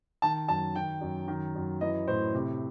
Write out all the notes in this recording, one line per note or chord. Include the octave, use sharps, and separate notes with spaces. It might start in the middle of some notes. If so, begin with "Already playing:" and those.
D#3 A5
F#2 A5
D#3 G5
F#2
D#3
F#2
E3 D#5
A2 C5
C3